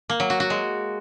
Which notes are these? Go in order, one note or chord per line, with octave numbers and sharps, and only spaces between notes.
A#3
F#3
F#4
F#4
G#3